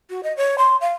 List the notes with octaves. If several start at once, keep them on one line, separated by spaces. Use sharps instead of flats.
F#4
D#5
C#5
C6
F5